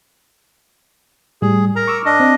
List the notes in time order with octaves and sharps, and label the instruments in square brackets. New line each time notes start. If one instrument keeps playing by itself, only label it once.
[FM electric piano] A2 G3 [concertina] G#4
[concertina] A#4 A#5
[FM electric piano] C#6 D6 E6
[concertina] D4 D#5
[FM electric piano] C4